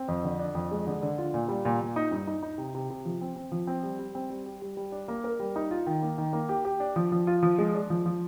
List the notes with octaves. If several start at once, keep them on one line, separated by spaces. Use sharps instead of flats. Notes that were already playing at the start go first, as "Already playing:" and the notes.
Already playing: C4
F2
D3
D4
F2
G#3
D3
D3
F4
A#2
G3
A#2
A#2
D#4
G2
D#4
D#4
C3
C3
C3
F3
C4
C4
F3
C4
G3
G3
C4
G3
G4
G3
G3
D4
A#3
A#4
G3
D#4
F4
D#3
A#3
D#3
A#3
G4
G4
D4
F3
F3
F4
F3
G#3
D4
F3
F3